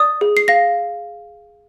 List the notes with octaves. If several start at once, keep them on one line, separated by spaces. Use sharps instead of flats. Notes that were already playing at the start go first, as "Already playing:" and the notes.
Already playing: D5 D#6
G#4
C7
F5 A#6